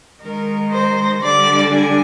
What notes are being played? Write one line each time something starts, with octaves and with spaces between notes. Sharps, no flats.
D#3 G#3 D#4 A#4
C5
D3 G3 D4 D5
G#5